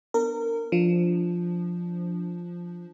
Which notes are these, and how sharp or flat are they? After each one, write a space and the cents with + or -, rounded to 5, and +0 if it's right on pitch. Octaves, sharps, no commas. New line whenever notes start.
B3 +0 D4 +10 A#4 -25
F3 +0 D4 +0